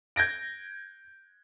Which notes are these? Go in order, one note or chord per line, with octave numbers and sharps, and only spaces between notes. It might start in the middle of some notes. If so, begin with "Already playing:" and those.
G6 G#6 A#6 D7